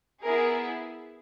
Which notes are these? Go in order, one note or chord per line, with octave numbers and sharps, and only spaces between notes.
B3 E4 G#4 A#4